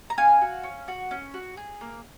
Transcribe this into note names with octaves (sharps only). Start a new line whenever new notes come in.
A#5
C#4 F5 G#5
F#4
C#4
F#4
C#4
F#4
G#4
A#3